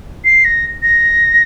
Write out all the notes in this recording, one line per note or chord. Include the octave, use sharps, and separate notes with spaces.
C7
A#6
A#6